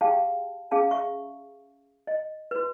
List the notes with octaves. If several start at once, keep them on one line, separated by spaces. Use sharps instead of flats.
G4 G#4 F5 G5 A5
C#4 G#4 F5 A5
E5 C#6
D#5
F#4 B4